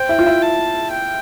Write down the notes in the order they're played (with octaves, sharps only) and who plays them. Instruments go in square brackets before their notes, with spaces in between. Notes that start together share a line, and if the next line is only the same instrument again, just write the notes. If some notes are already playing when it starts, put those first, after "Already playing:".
Already playing: [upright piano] C5 [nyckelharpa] G5
[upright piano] E4
F4
E4
[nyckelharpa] A5
G5